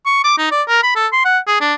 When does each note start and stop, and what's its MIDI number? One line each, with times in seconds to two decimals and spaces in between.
0.05 0.23 85
0.24 0.36 86
0.38 0.51 63
0.51 0.62 74
0.68 0.82 70
0.83 0.95 83
0.96 1.07 69
1.13 1.20 84
1.25 1.38 78
1.47 1.58 68
1.61 1.74 62